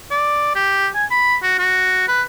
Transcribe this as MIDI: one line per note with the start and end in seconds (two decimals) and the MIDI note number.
0.11 0.53 74
0.55 0.87 67
0.95 1.05 80
1.11 1.36 83
1.43 1.59 66
1.59 2.07 66
2.08 2.22 71